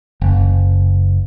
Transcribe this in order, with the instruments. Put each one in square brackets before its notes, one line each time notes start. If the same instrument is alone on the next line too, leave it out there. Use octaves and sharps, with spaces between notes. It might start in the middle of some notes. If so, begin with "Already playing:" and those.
[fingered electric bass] F#1